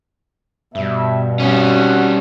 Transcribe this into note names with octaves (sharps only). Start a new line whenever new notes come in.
G2 B2 E5
G3 C4 C#4 F#4 F#5